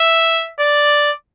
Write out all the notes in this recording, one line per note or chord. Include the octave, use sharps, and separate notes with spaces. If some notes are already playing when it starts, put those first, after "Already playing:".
Already playing: E5
D5